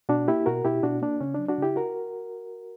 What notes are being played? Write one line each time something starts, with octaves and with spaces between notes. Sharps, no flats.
B2 D4 F#4
A#3 E4 G4
B2 F#4 A#4
B2 E4 G4
B2 D4 F#4
A#3 D4
C#3 C#4
F#3 D4
D4 F#4
C#3 E4 G4
F#4 A#4